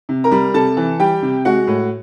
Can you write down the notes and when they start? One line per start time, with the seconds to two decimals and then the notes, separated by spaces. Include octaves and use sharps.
0.09 C3
0.24 A#4 A#5
0.32 G3
0.54 C3 A4 A5
0.77 E3
0.99 G3 G4 G5
1.22 C3
1.45 G#3 F#4 F#5
1.67 A2